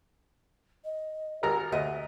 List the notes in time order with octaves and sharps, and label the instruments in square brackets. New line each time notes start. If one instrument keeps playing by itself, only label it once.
[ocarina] D#5
[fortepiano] G#1 A#4 A#5 [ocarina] G4
[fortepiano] D2 [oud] D#5 [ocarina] E5